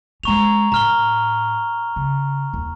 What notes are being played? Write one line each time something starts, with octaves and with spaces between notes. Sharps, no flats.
G#3 C#4 A#5 C#6 F7
A2 A#5 F6 G7
C#3
D#2